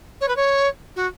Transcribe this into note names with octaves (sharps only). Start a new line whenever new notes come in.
C#5
B4
C#5
F#4